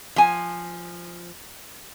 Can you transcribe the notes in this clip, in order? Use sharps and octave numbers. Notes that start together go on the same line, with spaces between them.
F3 G#5